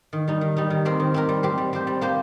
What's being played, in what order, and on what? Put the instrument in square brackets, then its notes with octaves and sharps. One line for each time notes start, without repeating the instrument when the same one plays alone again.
[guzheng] D#3
G3 D#4
D#3
G3 D#4
D#3
C4 G4 A#4
D#3
C4 G4 A#4
G3
C4 G4 C5
G3
C4 G4 C5
G3
A#3 G4 C5